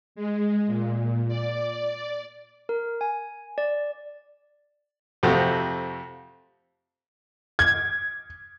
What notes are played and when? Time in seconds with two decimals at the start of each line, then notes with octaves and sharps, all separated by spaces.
0.15 G#3
0.67 A#2
1.28 D5
2.69 A#4
3.01 G#5
3.58 D5
5.23 F2 C3 A3 F#4
7.59 G#6